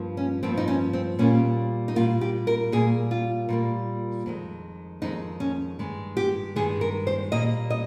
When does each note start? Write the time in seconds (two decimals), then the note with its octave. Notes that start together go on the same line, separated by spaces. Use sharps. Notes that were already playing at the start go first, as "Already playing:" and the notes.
Already playing: G2 F3 A#3
0.17 C#4
0.43 G2 F3 A#3 C4
0.57 D#4
0.68 C#4
0.93 C4
1.19 A#2 G3 A#3 C#4
1.88 D#4
1.95 A#2 G3 A#3 F4
2.21 G4
2.47 A#4
2.72 A#2 G3 A#3 G#4
3.11 F4
3.49 A#2 G3 A#3
4.26 F2 D#3 G#3
5.02 F2 D#3 G#3 D#4
5.40 C#4
5.79 G2 D#3 G#3
6.17 G4
6.56 G2 D#3 G#3 G#4
6.81 A#4
7.07 C5
7.32 A#2 G3 A#3 D#5
7.70 D#5